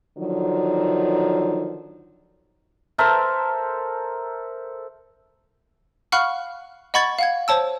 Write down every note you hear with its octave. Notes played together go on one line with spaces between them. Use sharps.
D3 D#3 F3 F#3
A4 A#4 C5 E5
F5 F#5 B5 C#6 F6 F#6
D#5 F#5 B5 C#6 G#6 A6
F5 F#5 G#6
C5 C#5 A5 E6